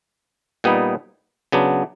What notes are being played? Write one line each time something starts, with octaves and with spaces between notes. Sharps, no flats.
A#2 G3 B3 D#4
C#3 F#3 B3 D4